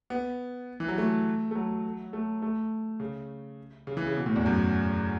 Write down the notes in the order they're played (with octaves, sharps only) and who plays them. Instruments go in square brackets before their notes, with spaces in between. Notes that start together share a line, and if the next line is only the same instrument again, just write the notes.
[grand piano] B3
E3
F#3
A3
A3
F#3
A3
A3
C#3
C#3
E3
C#3
B2
A2
E2
F#2